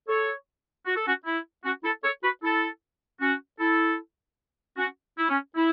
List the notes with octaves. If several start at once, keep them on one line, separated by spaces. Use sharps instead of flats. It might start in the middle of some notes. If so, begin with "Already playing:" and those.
A4 C#5
F#4
A4
C#4 F#4
E4
C#4 F#4
E4 A4
A4 C#5
F#4 B4
E4 A4
C#4 F#4
E4 A4
C#4 F#4
E4
C#4
E4